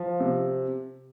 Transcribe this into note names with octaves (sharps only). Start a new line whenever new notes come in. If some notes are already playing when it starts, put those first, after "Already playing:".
Already playing: F3
C3